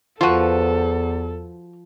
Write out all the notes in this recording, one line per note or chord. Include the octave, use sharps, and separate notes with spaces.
E2 F3 F4 F#4 A4 B4